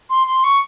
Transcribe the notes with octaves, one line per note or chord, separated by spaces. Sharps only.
C6
C6
C#6